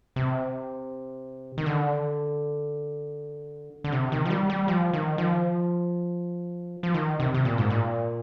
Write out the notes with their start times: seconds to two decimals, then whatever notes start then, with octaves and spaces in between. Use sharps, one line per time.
0.16 C3
1.58 D#3
1.66 D3
3.84 D3
3.92 C3
4.12 D#3
4.25 F3
4.30 G3
4.50 G3
4.68 F3
4.93 D#3
5.18 F3
6.83 F3
6.94 D#3
7.20 C3
7.34 C3
7.45 A#2
7.58 G#2
7.70 A#2